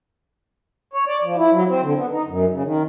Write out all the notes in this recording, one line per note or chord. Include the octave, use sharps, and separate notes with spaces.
C#5
D5
F3
E4
F#3
C4
D3
B3
D#4
F#2
C#3
D#3